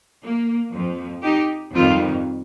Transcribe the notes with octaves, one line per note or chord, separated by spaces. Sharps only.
A#3
F2 F3
D#4 G4
F2 D#3 G3 C4 F4